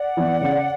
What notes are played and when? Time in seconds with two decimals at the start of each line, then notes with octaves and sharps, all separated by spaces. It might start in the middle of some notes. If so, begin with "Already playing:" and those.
Already playing: D5 F#5
0.17 E3 B3
0.41 C#3